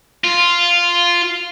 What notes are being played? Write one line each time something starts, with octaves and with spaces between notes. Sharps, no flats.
F4